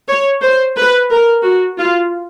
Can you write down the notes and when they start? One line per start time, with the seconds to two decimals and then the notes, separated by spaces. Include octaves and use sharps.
0.08 C#5
0.42 C5
0.76 B4
1.11 A#4
1.44 F#4
1.79 F4